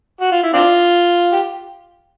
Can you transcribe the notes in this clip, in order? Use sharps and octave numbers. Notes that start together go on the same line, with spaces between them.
F#4
F4
E4
C4 D4 F4
G4